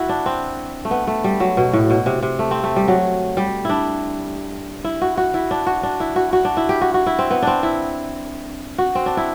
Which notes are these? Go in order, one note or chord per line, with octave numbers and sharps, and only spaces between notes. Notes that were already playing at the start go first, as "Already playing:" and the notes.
Already playing: E4 F#4
D4
C4
A3
B3
A3
G3
F#3
B2
A2
B2
C3
C3
A3
C4
A3
G3
F#3
G3
D4 E4
E4
F#4
F#4
E4
D4
F#4
D4
E4
F#4
F#4
D4
E4
G4
F#4
F#4
E4
C4
B3
C4 D4
E4
F#4
C4
D4
E4